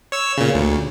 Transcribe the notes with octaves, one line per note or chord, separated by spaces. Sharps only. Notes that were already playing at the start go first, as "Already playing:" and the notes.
C#5 E6
A#2 C#3
D2